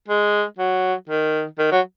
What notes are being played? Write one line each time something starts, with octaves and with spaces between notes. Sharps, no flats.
G#3
F#3
D#3
D#3
F#3